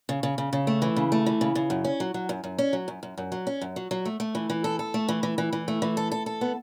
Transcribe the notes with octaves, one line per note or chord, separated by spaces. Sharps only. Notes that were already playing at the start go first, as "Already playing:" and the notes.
C#3
C#3
C#3
C#3
A3
E3
C#3
A3
E3
C#3
C#3
F#2
C#4
F#3
F#3
F#2
F#2
C#4
F#3
F#2
F#2
F#2
F#3
C#4
F#2
F#3
F#3
A3
A3
E3
E3
A4
A4
A3
E3
E3
E3
E3
A3
E3
A4
A4
A4
B3